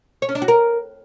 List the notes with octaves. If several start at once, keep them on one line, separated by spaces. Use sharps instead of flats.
C#5
C#4
D4
F#4
A#4